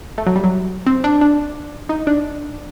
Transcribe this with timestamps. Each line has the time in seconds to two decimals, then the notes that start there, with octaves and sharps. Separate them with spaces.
0.18 A3
0.27 F#3
0.36 G3
0.44 F#3
0.87 C4
1.04 D4
1.21 D4
1.89 D#4
2.07 D4